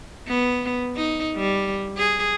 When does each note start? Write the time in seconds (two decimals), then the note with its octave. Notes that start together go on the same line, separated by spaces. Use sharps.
0.28 B3
0.97 D#4
1.36 G3
1.97 G#4